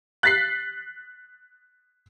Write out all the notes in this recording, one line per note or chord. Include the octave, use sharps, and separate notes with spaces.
F#6 A6 B6 C7